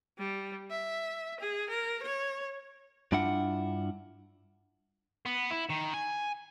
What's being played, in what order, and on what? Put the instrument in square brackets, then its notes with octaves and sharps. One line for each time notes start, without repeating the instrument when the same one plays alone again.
[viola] G3
E5
G#4
A#4
C#5
[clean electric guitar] G2 D4 E4 F4 F#5
[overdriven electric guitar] B3
E4
D#3
G#5